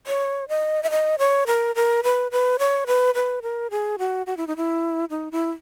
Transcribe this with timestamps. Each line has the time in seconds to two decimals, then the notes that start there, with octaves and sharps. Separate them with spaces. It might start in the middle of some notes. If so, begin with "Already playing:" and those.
0.07 C#5
0.49 D#5
0.83 E5
0.91 D#5
1.19 C#5
1.47 A#4
1.76 A#4
2.04 B4
2.31 B4
2.59 C#5
2.87 B4
3.15 B4
3.42 A#4
3.71 G#4
3.99 F#4
4.27 F#4
4.37 E4
4.47 D#4
4.57 E4
5.10 D#4
5.32 E4